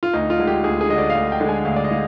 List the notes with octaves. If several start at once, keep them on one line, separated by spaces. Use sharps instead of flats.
F4
D2 D#4
F4
D3 G#3
G4
D2 G#4
G#4
D3 G#3 D#5
D5
F5
D2 D#5
G5
D3 G#3
G#5
D2 F5
D5
D#5
G#3 F5